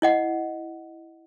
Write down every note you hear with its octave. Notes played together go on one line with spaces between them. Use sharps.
E4 D#5 F#5